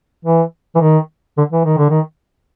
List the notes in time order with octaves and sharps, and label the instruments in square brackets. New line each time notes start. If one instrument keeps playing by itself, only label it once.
[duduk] E3
E3
D#3
D3
E3
D#3
D3
D#3